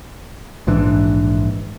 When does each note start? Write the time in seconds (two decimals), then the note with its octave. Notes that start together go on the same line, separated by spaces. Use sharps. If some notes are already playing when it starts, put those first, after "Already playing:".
0.67 A#1 G#2 E3 D4